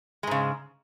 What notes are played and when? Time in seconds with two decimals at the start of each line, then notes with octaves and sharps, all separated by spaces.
0.23 G#3
0.27 G#2
0.31 C#3